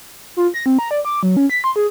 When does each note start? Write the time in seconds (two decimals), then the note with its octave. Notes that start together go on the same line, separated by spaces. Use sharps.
0.37 F4
0.54 A#6
0.66 C4
0.79 A#5
0.91 D5
1.05 D6
1.23 F#3
1.37 C#4
1.50 B6
1.64 C6
1.76 G#4